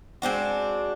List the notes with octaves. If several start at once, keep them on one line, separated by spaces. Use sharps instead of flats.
G#3 C4 D4 F#4